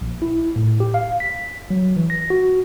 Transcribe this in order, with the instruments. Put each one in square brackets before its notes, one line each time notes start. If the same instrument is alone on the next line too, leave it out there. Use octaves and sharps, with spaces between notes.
[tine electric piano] A#1
E4
A2
G4
F5
B6
F#3
E3
A#6
F#4